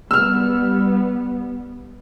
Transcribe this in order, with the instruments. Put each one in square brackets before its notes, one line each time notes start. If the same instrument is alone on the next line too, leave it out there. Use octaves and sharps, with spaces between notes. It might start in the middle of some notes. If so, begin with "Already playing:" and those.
[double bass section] G3 B3 [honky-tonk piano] E6 F6